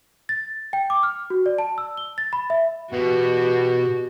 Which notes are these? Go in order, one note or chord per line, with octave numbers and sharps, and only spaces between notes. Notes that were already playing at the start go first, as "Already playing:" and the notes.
A6
G5
D6
F6
F#4
D5
A5
E6
G7
A6
B5
E5
E2 B2 F#4 G4 B4